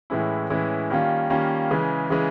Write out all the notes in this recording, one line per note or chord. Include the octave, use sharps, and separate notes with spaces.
A2 E3 G#3 C#4 E4
A2 E3 G#3 C#4 E4
D#3 G3 A#3 C#4 F4
D#3 G3 A#3 C#4 F4
C#3 E3 G#3
C#3 E3 G#3